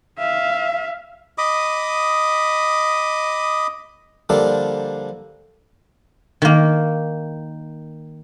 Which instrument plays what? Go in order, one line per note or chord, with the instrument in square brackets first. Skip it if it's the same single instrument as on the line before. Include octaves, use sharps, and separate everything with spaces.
[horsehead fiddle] E5 F5
[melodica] D#5 B5 D6 D#6
[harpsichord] D3 F3 G3 A#3 D4 A4
[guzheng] D#3 A#3